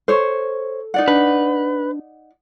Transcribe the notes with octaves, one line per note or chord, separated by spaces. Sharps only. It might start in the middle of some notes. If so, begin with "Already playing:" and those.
A4 C5 C#5
D#4 D5 F#5
D4 B4